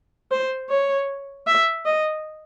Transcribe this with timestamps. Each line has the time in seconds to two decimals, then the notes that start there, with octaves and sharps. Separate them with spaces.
0.31 C5
0.70 C#5
1.47 E5
1.85 D#5